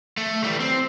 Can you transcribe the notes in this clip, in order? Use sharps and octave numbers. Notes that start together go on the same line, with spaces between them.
A3
E3 G3
C4